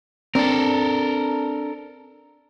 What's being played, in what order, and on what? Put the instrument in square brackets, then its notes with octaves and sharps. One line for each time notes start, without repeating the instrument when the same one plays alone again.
[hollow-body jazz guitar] C4 D4 [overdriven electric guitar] A4 A#4